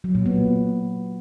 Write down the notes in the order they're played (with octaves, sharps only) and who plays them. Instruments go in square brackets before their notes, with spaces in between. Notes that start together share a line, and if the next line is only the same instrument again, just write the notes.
[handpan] F#3
A#2
B3